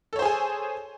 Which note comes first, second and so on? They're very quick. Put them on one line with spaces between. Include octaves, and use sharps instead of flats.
A4 C#5 C5 G#4 G#5